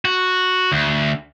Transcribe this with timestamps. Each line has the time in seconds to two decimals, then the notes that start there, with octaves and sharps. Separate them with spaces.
0.05 F#4
0.72 D2